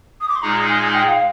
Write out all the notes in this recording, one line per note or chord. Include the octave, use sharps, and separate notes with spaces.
D#6
D6
C6
A#2 G#3 D#4 G#4 A#5
G#5
G5
F5